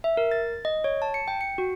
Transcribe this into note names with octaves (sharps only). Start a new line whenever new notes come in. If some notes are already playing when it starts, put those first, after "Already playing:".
E5
A#4
A6
D#5
C#5
A5
C#7
G5
C#7
F#4